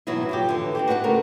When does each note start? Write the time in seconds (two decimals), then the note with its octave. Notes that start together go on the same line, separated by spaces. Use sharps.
0.07 G2 B2 E3 F#3 B3 E4
0.29 F2 F#3 G4
0.49 D3 E3
0.75 C4 D4 G4
0.88 F#4 B4 D5 F5 F#5
1.04 C#3 A3 A#4